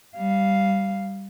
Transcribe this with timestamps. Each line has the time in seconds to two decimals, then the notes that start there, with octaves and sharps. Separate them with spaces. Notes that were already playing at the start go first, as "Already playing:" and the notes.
0.17 G3 F5